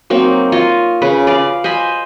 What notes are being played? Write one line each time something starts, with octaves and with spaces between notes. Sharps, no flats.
F#3 A#3 C4 D#4
F4 C#5 D#5
C#3 B4
D5 F5
C5 D#5 G#5 B5